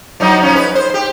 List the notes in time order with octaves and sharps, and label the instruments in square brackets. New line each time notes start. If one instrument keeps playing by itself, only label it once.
[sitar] F3 F#3 D#4
F3 C#4
B4
C5
G4